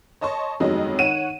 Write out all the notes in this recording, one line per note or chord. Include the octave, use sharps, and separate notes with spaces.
C#5 D#5 A5 C6 C#6
G1 F2 D#3 F#3 G#3 D#5
D#3 C#5 F#5 D#7 E7